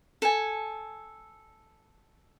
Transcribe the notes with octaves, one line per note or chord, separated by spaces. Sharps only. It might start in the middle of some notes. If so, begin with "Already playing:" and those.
A4 G#5